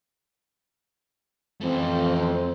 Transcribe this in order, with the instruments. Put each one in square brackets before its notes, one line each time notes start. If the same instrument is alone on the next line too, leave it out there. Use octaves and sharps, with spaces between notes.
[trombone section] F2 [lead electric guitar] E3 A3 [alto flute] C4